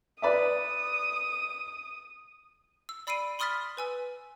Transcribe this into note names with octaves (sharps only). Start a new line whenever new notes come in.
B4 D5 E5 D#6
E6
D5 B5 E6 C7 D7 D#7
B5 C6 D#6 F6 A6 B6
B4 G#5 E6